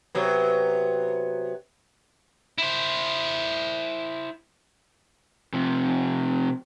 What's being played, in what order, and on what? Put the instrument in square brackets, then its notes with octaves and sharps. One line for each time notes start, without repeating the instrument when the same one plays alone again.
[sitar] C3 F#3 B3
[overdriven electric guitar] E4 C5
[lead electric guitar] C3 F3